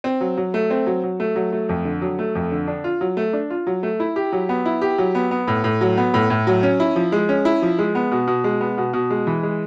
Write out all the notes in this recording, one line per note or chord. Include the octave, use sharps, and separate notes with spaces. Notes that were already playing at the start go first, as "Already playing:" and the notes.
C4
F#3
F#3
A3
C4
F#3
F#3
A3
F#3
A3
F2
D3
F#3
A3
F2
D3
D4
F4
F#3
A3
D4
F4
F#3
A3
E4
G4
F#3
B3
E4
G4
F#3
B3
B3
A2
A2
F#3
B3
A2
A2
F#3
C#4
E4
F3
G#3
C#4
E4
F3
G#3
B3
B2
B2
G#3
B3
B2
B2
G#3
E3
G#3